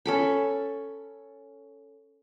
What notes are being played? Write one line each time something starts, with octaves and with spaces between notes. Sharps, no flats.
C#4 A4 B5